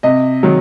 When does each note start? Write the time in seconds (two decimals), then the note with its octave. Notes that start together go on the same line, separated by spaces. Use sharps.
0.03 C3 D#5
0.43 D#3 F#3